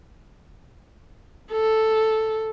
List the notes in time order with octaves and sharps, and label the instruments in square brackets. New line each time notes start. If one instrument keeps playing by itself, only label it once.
[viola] A4